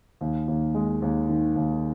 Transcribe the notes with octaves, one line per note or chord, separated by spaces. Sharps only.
D#2
D#2
G#3
D#2
D#3
D#2